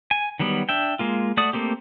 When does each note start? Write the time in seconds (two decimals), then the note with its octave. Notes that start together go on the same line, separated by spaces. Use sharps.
0.11 G#5
0.40 D#3 F#3 G3 B3
0.69 D4 E5 G5
0.99 G#3 A#3 F4
1.37 A3 F#4 D5 D#6
1.53 A3 A#3 C4 G4